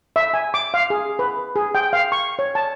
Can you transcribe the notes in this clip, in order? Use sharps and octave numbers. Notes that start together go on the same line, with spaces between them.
E5
G#5
D6
F5
G#4
B4
G#4
G5
F5
C#6
C#5
A5